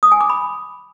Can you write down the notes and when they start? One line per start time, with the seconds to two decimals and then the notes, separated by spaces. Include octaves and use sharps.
0.03 D#6
0.12 G#5
0.21 D6
0.30 B5